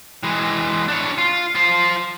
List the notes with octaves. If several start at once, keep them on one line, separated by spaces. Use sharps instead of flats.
E3 G#3
D4 C#5
F4
F4 C5